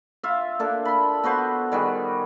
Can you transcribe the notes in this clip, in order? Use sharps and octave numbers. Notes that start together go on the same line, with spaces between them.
F4 E5
A#3 D4 A4
B5 C6
B3 F#4 B4 C5
D#3 G3 F#4 G#4